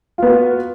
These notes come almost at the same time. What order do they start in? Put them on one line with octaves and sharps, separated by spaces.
F4 B3 F#4